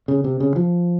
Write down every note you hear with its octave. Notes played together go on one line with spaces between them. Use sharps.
C#3
C3
C#3
F3